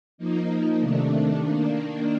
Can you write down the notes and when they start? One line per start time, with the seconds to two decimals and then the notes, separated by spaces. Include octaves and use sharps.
0.18 F3 A#3 D#4
0.79 C3 D#3 A3 D4
1.41 D#3 A#3 D4